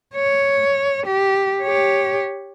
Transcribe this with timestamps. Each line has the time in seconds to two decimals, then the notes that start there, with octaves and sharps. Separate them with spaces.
0.15 C#5
1.06 G4
1.62 G4 C#5